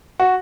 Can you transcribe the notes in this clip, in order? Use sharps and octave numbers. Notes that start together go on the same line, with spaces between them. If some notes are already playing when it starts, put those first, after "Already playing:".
F#4